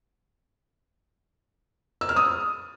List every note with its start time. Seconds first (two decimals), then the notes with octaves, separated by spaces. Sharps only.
2.01 E6
2.09 F6
2.16 D#6